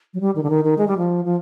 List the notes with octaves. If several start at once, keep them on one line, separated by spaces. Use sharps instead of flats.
F#3
G3
D#3
D3
D#3
D#3
G#3
G3
F3
F3